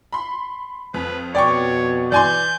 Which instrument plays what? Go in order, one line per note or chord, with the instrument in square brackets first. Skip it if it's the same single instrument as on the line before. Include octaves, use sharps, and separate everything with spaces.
[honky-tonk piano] B5 C6
[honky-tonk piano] F2 [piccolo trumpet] B4
[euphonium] B2 [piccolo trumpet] C#5 [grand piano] D5 G5 C#6
[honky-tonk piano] E3 [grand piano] D5 G#5 C6 [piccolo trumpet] G6